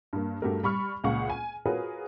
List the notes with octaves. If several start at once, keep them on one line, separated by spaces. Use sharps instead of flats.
G2 A#3
G2 A3 F#4 G4 A#4
G3 B5 C#6 F6
C#2 A#2 G#4 F5 F#5 C#6
G#5
F4 F#4 G#4 A#4 B4 C#5